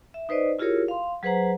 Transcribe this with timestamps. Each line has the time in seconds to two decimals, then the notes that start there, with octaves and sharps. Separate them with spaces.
0.14 E5
0.29 D#4 B4 C5 D5 D#5
0.59 E4 F4 G4 G#4 A#4 C#5
0.88 F5 C6
1.23 F#3 G#4 B4 C5 F#5 A#5